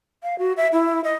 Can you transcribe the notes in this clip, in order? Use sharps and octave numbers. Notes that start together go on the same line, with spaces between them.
F5
F#4
E5
E4
D#5